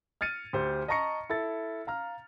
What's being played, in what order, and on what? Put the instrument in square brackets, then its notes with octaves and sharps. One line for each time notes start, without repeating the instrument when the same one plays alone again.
[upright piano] F6 G#6 A6 C#7 D#7
D2 G4 C5
D#5 A5 A#5 C#6 A#6 C#7
E4 A4 A6
F5 A#5 F6